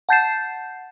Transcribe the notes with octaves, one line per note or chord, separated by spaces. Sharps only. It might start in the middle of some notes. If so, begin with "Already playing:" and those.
F#5 A5 G6 A6 C7 E7